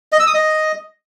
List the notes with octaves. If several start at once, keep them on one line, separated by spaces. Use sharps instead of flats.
D#5
E6
D#6
D#5